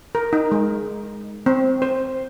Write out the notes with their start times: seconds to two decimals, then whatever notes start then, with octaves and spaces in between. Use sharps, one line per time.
0.15 A#4
0.33 D#4
0.52 G#3
1.46 C4
1.82 C5